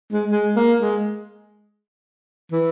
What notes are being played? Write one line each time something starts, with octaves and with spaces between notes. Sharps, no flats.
G#3
G#3
A#3
G#3
E3